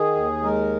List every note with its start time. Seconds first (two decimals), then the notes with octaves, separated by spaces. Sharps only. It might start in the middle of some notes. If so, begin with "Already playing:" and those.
Already playing: D#3 G#4
0.15 D#2
0.43 G#3 A#4